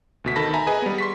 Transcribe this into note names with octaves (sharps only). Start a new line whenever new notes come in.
D2 B2 B6
D#3 A4 A5 B5 A#6 B6
E5 G#5 A#5 B5
G#4 B4 D#5 G#5
G3 B3
C6 C#6 B6